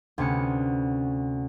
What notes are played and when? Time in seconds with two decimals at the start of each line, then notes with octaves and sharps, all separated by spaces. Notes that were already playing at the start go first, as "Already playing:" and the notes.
0.18 D2 C3 B3 C#4 C#7